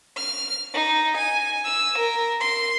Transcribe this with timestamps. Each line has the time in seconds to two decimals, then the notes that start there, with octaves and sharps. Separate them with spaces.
0.17 F6
0.74 D#4
1.18 G#5
1.65 E6
1.99 A#4
2.41 C6